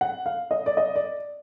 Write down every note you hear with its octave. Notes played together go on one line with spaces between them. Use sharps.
F#5
F5
D#5
D5
D#5
D5